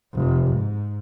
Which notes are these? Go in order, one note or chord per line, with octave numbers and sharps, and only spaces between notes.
F1
G#2